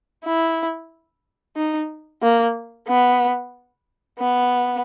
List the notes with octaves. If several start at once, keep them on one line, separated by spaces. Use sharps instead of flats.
E4
D#4
A#3
B3
B3